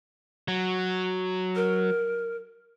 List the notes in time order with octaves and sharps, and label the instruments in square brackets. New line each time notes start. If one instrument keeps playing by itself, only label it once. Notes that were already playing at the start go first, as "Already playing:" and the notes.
[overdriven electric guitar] F#3
[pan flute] A#4